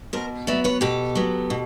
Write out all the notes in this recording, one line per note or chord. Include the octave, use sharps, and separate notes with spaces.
B2 A#4 C5
F#3 B3 D5 E5
B4 C#5
B2 G4 A4
F#3 B3
B2